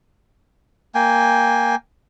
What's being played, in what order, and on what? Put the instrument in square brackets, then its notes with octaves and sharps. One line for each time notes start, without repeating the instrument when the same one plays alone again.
[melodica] A#3 G5 G#5